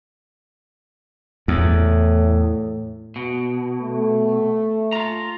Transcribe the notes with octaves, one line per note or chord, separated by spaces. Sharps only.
E2 A2
B2
A3
F4 A#5